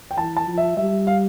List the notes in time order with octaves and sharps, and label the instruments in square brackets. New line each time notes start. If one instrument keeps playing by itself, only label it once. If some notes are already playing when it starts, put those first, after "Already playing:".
[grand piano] G5
[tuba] E3 [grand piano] A5
[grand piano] A5
[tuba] F3
[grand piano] E5
[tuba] G3 [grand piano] E5
[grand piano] F5